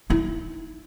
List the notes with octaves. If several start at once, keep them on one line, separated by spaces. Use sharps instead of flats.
D#4 E4